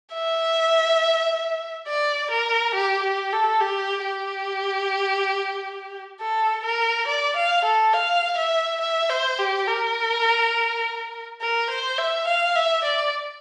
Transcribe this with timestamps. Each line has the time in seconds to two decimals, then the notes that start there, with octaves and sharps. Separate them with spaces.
0.14 E5
1.87 D5
2.31 A#4
2.75 G4
3.03 G4
3.33 A4
3.61 G4
4.04 G4
6.21 A4
6.64 A#4
7.08 D5
7.36 F5
7.64 A4
7.93 F5
8.37 E5
8.81 E5
9.10 C5
9.39 G4
9.67 A#4
11.41 A#4
11.70 C5
11.98 E5
12.27 F5
12.55 E5
12.84 D5